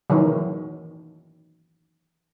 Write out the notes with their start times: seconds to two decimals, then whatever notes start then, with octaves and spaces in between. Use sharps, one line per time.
0.10 D#3 E3 F#3